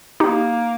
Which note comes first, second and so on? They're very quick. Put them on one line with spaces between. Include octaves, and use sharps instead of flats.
C4 D#4 G4 A#3